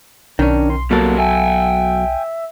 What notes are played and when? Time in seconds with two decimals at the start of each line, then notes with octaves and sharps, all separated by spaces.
0.39 B1 D#3 C#4 D4
0.70 C6
0.91 B2 F#3 G3 A#3 A4 A#4
1.18 E5 G5 G#5